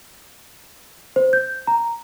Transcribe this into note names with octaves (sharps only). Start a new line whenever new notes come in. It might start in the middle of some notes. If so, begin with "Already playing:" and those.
C5
G6
A#5